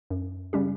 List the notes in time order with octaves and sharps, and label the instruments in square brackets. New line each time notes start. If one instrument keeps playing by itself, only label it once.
[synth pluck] F#2
C#3 G3 C#4 G4